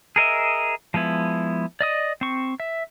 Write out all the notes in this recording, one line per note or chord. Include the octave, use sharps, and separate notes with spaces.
G#4 A#4 D#5 E5
F3 G#3 B3 E4
D5 D#5 D#6
C4 C#6
E5